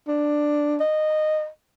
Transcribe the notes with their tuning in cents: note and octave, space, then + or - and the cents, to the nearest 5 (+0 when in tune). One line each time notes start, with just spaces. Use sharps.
D4 +5
D#5 -15